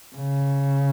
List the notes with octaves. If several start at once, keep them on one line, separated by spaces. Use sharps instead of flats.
C#3